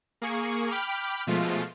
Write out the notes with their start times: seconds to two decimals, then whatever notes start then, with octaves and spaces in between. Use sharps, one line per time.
0.22 A#3 G#4 C#6
0.70 G5 B5 D6 F6
1.27 B2 F3 G#3 A3 F4